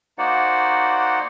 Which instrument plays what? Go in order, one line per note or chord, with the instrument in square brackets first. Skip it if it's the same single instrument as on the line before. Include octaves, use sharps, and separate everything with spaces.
[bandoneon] A#3 D#4 F#4 C5 D5 F#5